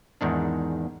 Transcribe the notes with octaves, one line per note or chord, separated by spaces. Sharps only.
E2 G#2 D#3 D4